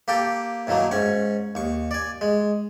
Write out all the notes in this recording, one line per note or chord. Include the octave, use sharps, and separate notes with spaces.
A#3 G4 A4 G5
A2 D#3 F#3 A3 A#3
G#2 C#4 C#6
D#2 C#6
D5 G#5
G#3